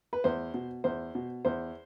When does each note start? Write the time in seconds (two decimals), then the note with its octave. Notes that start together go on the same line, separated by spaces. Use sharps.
0.13 B4
0.24 E2 C5
0.54 B2
0.84 E2 C5
1.15 B2
1.45 E2 C5